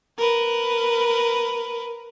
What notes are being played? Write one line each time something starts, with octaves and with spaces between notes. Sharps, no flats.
A#4 B4